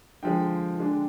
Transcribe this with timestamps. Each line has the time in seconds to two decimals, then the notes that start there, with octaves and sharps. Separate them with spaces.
0.23 D3 F3 G#3 G5
0.77 D3 G#3 D4